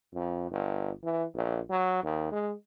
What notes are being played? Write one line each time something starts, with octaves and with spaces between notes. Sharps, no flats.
F2
G1
E3
A#1
F#3
D#2
G#3